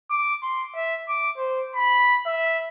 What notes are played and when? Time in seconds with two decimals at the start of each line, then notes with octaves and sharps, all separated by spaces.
0.11 D6
0.42 C6
0.75 E5
1.09 D6
1.37 C5
1.75 B5
2.26 E5